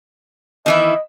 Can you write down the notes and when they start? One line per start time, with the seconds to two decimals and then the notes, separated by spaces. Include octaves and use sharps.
0.66 D#3 E3 E4 D#5